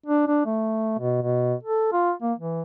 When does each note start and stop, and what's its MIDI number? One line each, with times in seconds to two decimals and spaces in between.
0.06 0.27 62
0.28 0.44 62
0.46 0.98 57
0.99 1.22 47
1.22 1.55 47
1.63 1.91 69
1.93 2.12 65
2.22 2.33 58
2.39 2.62 52